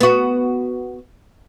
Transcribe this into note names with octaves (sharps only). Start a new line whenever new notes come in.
B3 F#4